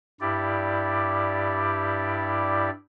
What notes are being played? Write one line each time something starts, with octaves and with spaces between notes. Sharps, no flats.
G2 E4 G4 D5